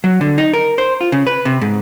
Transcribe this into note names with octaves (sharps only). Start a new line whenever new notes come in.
F#3
D3
D#4
A#4
C5
F4
C#3
B4
C3
G#2